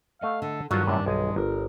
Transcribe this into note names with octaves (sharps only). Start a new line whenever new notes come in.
A3 D#5 F5 F#5
D3 A4
G2 D#3 F#3 G3 F4 F#4 D5
F#2 A2 C3 D4
B1 G#3 G#5
G1 A#4